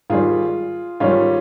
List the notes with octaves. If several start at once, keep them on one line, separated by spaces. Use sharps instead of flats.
G#2 D#3 G3 F4 G#4
G#2 D#3 G3 C#4 F4